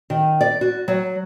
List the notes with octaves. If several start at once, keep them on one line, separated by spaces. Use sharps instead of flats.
D#3
D5
F#4
F#3